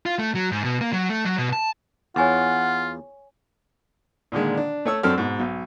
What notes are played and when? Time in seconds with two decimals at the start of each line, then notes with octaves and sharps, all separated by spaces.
0.06 F4
0.19 A3
0.35 F#3
0.52 G#2
0.64 B2
0.81 A#3
0.93 F#3
1.09 A3
1.25 F#3
1.38 B2
1.53 A5
2.16 E2 F4 C#5 F#5 G#5 C#6
4.32 A#2 D3 D#3 G#3
4.57 D4
4.85 A3 C#5 E6
5.03 F#2 C4 D4 A4 F6
5.18 G#2 B2
5.39 B1